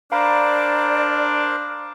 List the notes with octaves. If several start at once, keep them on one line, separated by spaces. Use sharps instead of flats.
D4 A#4 C5 D5 F5 A#5 B5 D6